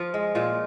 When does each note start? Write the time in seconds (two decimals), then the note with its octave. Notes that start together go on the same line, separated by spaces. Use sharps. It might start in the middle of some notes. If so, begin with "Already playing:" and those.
Already playing: F3 F4
0.14 G#3
0.35 A#2 F4